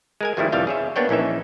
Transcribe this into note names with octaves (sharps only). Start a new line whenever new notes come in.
G#3 A#4 G#5
G2 D#3 F3 G3 A3 E4
C2 F2 E3 G3 F5 G5
G#4 C#5 E5
A#3 B3 D4 C#5 G5
A#1 E3 C#4 D#4 E5